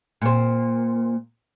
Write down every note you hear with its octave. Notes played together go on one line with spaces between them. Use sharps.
A#2 C4